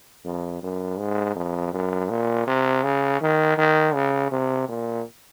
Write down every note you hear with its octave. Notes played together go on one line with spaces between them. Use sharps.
F2
F#2
G#2
F2
F#2
A#2
C3
C#3
D#3
D#3
C#3
C3
A#2